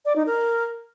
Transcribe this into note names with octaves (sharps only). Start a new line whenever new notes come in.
D5
D#4
A#4